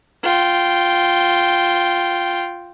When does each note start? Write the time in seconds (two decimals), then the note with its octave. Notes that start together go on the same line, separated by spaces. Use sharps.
0.24 F4 G5